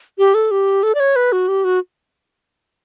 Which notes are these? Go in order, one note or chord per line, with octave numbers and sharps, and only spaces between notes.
G4
A4
G4
A4
D5
C#5
B4
F#4
G4
F#4